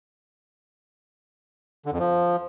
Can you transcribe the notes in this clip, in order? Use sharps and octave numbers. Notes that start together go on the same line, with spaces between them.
D3
F2
F3